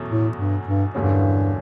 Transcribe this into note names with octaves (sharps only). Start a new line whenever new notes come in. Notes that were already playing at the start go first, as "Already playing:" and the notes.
Already playing: E2 B2 F#3 A3 C#4
A2
G2
G2
E1 E2 G2 D3 G3 C#4